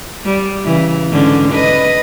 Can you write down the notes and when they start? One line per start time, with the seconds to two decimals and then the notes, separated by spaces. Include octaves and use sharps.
0.25 G3
0.65 C#3 E3
1.11 G#2 D3 C#4
1.53 B4 D#5